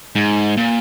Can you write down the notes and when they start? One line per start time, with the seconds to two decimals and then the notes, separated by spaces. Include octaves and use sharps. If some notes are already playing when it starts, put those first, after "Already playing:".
0.15 G#2
0.58 A#2